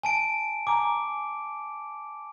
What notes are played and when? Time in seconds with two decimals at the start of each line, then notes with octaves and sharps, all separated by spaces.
0.03 G#5 A5 D7
0.67 G#5 A#5 D6